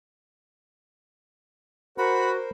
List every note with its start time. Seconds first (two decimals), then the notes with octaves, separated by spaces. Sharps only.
1.98 F#4 A#4 C5 B5